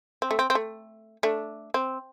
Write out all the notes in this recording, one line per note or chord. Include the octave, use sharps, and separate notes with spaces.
C4
A3
C4
C4
A3
A3 D4
C4